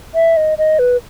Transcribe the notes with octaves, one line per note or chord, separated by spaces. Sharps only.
E5
D#5
D#5
B4